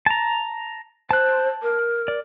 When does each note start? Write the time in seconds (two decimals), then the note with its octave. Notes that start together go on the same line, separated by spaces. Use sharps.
0.06 A5 A#5
1.11 C5 A5 F#6
1.62 A#4
2.08 D5